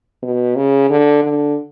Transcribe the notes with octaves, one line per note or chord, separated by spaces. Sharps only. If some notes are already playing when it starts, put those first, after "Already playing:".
B2
C#3
D3
D3